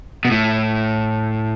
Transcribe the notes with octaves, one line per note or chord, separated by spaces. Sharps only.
B2
A2